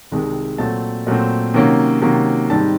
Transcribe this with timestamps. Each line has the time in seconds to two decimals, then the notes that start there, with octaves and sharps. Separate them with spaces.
0.12 C2 C3 D#3 G#3
0.58 A#2 F#3 A3 C4 A5
1.07 A#2 F#3 A3 C4
1.54 C3 D#3 F#3 A#3 C#4
2.01 C3 D#3 F#3 A#3 C#4
2.50 G#2 D#3 G3 C4 A5